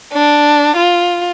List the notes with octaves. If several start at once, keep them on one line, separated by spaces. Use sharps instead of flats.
D4
F4